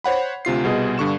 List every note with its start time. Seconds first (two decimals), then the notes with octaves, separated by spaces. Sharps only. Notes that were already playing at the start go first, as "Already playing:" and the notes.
0.04 C5 C#5 F#5 B5
0.45 D2 C3 F4 C7
0.64 C2 B2 G#4 D#5
0.98 G2 D3 C#6 E7